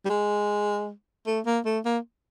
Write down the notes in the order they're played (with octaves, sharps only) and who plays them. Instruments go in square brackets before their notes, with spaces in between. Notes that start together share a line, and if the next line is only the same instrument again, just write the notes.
[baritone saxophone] G3
G#3
A3
A#3
A3
A#3